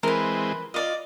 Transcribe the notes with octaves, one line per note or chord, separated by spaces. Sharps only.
E3 G#3 C4 A#4 B4
F4 D5 D#5